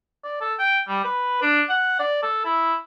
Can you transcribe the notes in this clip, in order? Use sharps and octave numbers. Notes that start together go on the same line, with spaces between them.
D5
A4
G5
G3
B4
D4
F#5
D5
A4
E4